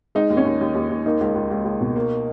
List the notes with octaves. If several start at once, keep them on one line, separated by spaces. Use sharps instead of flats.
G#3 D#4
D#2
C#4
D#2
D#2
D#2
D#2
A#3 D#4
C#2
C#2
C#2
C#2
B2
A#3